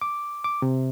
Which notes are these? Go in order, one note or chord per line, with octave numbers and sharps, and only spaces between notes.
D6
D6
C3